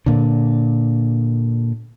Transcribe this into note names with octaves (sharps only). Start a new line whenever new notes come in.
A#2 D3